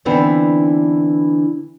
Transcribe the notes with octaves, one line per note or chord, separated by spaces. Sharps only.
D3 E3 B3 C4 D4 D#4